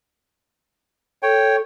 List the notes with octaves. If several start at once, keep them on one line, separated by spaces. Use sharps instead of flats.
A4 C#5 G5